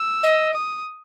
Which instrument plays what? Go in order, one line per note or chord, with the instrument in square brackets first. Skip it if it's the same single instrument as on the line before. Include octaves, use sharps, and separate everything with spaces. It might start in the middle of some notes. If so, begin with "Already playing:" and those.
Already playing: [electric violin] E6
[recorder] D#5
[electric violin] D#6